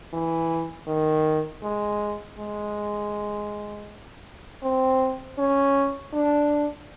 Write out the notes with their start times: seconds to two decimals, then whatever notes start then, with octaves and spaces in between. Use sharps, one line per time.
0.13 E3
0.87 D#3
1.63 G#3
2.39 G#3
4.63 C4
5.38 C#4
6.13 D4